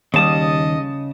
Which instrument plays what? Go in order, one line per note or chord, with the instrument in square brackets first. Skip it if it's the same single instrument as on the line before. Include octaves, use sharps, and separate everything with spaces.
[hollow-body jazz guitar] D#2 G3 [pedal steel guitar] C#3 A5 D#6 [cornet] D#5